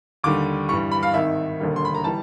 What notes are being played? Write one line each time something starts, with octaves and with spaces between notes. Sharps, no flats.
D#2 D3 G3 D6
G2 E3 G3 C#6
B5
F5
G#1 G#2 D#3 E5
E1 D#2 D3 G3 A#3
C6
B5
A#5
E3 G3 A5